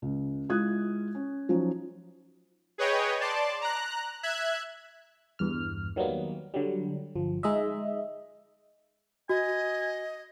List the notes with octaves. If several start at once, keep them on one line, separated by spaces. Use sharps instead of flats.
C#2
G#3 E4 F4 D#6 F#6 G#6
C#4
F3 F#3 C#4 D#4
G#4 B4 C#5 D#5 G5
D5 A5 C6 D6
A#5 F#6
E5 F#6 G#6
E2 G2 F6
D#3 F#3 G3 A#3 B3
D3 F#3 G3
G1 F3
G#3 D#4 D#5 E5
F#4 D#5 G#5